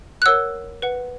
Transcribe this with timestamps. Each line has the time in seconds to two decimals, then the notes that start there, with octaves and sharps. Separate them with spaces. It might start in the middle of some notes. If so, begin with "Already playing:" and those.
0.22 F#6
0.26 A#4 C#5 F#5 E6
0.82 B4 F#5